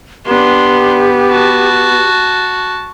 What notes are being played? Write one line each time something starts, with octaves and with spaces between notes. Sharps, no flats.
B3 D4 G4 C6
F#4 A5